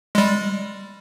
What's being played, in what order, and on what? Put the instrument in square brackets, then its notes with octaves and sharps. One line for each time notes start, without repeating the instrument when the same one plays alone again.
[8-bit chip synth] G3 G#3